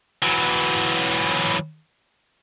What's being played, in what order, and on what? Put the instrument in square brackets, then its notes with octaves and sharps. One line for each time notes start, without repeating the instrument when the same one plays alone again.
[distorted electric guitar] E3 F#3